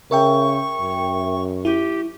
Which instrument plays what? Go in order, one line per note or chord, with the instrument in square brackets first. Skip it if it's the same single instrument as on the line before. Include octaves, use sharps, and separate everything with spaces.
[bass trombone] C#3 [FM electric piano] A#4 E5 G5 [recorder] C#6
[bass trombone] F#2
[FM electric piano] E4 [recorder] G4